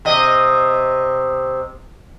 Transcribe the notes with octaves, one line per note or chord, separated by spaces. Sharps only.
C3 D#5